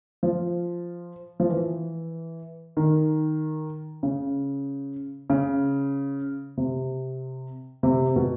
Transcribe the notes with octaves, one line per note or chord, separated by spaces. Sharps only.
F3
F3
E3
D#3
C#3
C#3
C3
C3
B2